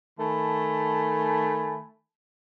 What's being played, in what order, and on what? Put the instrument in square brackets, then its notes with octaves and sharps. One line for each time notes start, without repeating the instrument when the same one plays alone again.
[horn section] D#3 A3 G#5 A5 B5